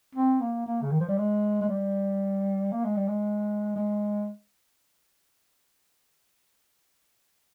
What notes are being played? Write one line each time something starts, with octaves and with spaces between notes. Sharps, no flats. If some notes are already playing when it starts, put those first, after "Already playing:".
C4
A#3
A#3
C#3
D#3
F3
G3
G#3
G#3
G3
A#3
G#3
G3
G#3
G#3